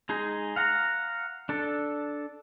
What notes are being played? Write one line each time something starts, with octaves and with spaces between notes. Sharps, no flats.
G#3 D#4 G#4
F5 F#5 A#5
D4 A4